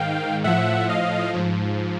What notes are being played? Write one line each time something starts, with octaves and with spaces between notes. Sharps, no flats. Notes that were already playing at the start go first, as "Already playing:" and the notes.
Already playing: G#2 D#3 F5 G5
A2 F3 E5 F#5
D#5 F5
G#2 F3